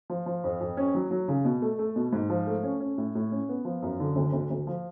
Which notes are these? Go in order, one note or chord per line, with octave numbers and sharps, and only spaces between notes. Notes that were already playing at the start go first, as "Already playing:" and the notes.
F3
F3
F2
F2
C#4
F#3
F#3
C#3
B2
A3
A3
B2
G#2
F3
A3
C#4
C#4
A2
A2
C#4
B3
F3
F#2
D3
D2
D2
D2
F3